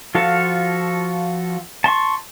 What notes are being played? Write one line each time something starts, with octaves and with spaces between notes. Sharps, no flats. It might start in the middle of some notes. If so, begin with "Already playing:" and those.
F3 F4 F#4 A4 F5
A5 C6 C#6